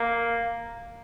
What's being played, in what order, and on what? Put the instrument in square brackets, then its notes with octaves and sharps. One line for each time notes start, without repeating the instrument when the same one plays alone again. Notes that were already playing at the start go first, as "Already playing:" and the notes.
Already playing: [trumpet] A#3